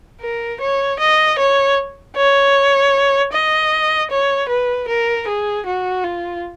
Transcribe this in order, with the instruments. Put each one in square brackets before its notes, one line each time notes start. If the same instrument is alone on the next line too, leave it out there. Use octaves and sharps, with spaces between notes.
[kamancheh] A#4
C#5
D#5
C#5
C#5
D#5
C#5
B4
A#4
G#4
F#4
F4